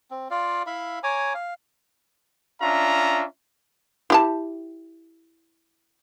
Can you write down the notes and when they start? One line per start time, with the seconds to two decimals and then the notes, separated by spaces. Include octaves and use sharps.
0.11 C4
0.31 F4 D5 F5
0.67 E4 E5 F5 B5
1.03 C#5 G#5 A#5 D6
1.34 F5
2.62 C#4 D4 F4 E5 A#5
4.10 E4 G4 A5